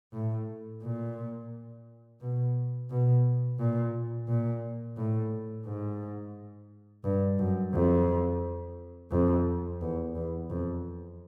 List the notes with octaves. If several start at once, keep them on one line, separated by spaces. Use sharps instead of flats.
A2
A#2
B2
B2
A#2
A#2
A2
G#2
G2
F#2
F2
F2
E2
E2
F2